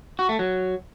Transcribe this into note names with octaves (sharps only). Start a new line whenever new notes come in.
F#4
A3
F#3